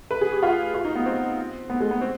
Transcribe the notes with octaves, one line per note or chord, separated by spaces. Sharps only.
B4
G#4
G4
F4
F4
D#4
B3
C4
B3
G#3
B3
C4